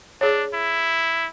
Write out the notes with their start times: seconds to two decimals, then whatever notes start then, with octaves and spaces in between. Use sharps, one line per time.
0.21 D4 G#4 C#5
0.54 E4